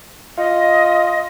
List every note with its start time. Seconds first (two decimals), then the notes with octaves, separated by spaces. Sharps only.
0.38 F4 D#5